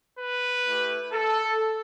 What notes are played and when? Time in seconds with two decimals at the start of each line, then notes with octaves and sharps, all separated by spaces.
0.20 B4
0.66 A3 E4 G4
1.12 A4